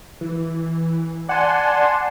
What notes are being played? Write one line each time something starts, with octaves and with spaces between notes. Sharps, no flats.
E3
D5 F#5 G#5 A5 C6